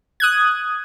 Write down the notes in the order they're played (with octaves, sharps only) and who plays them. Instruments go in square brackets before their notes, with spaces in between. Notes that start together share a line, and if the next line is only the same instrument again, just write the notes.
[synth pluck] D#6 F#6 G#6